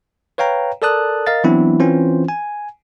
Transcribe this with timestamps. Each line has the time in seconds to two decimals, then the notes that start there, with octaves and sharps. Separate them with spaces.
0.38 B4 C#5 F5 G5 A#5
0.82 A4 A#4 D5 A5 D#6 F#6
1.27 A#4 D#5 F5 A6
1.44 E3 F#3 B3 C4 D4 E4
1.80 E3 C4 C#4 F4 C5
2.28 G#5